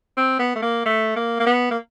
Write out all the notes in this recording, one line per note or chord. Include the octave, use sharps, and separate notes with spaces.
C4
B3
A3
A#3
A3
A#3
A#3
B3
A#3